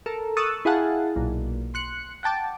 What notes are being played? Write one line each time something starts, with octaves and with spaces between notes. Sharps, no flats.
A4 A#4
C#6 D#6 E6 F#6 A6
E4 G#4 F5 F#5 A5
B1 A#2
C6 F#6 C#7
F#5 G5 A5 D6